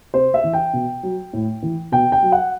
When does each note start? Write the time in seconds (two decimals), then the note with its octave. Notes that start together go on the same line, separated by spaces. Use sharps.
0.14 C3 C5
0.34 E5
0.43 E3
0.53 G5
0.73 B2
1.03 F#3
1.33 A2
1.62 E3
1.92 B2 G5
2.12 G5
2.22 F#3
2.32 F#5